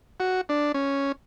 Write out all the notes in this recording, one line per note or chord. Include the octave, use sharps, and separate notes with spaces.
F#4
D4
C#4